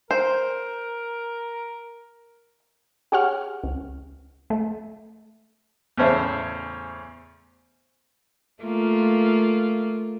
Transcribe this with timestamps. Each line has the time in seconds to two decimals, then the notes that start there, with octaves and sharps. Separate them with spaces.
0.11 A#4 C5
3.12 G4 G#4 C#5 F#5 F6
3.64 C#2
4.50 A3
5.97 E2 A2 C#3 C5 C#5 E5
8.64 A3 A#3 F4